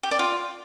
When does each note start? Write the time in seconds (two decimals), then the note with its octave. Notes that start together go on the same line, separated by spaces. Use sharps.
0.03 G4
0.11 D5
0.19 F4